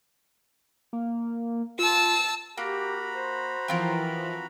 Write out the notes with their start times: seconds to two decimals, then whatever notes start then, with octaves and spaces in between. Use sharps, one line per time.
0.93 A#3
1.79 F4 A5 E6
2.57 A#3 F#4 G4 A#5 B5
3.13 C5
3.68 E3 F3 C4 F4 A#4